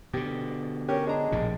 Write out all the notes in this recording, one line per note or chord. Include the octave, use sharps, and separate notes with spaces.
B2 D3 G4
C#4 G4 A#4
G#3 D4 A#5
A#1 A2 C3